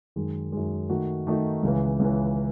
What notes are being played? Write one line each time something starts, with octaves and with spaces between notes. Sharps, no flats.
F#2 D#3 G#3
F#2 D#3 G#3
D#3 A3 D#4 F#4
D#3 A3 D#4 F#4
C#2 C#3 E3
C#2 C#3 E3